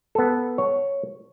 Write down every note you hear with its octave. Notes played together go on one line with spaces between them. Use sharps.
B3 A4
C#5